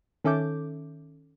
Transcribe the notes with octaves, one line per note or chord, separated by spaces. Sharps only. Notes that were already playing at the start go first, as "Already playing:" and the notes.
D#3 C#4 A4 E5 D6 G6